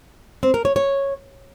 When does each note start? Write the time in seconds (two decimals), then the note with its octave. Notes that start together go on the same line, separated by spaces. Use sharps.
0.43 C4
0.54 A#4
0.65 C#5
0.76 C#5